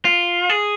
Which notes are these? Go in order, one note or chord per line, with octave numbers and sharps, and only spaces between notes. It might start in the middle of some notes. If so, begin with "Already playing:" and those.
F4
G#4